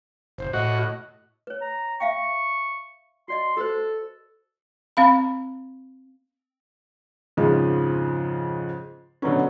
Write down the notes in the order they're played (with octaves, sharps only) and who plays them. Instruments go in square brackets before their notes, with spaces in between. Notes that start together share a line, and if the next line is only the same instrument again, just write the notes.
[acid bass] F#1 [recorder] C5
[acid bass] A2 [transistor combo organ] F#4 [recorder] D#5
[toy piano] B4 C#5
[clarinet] A#5
[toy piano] E5 F5 G5 [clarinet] C#6
[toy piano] F#4 D5 D#5 [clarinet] C6
[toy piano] F#4 B4 C5 [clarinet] A4
[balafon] C4 F5 B5
[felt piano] F2 G#2 C#3 F3 G#3
B2 D3 F#3 B3 C#4